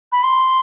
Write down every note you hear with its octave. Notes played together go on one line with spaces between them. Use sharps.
B5
C6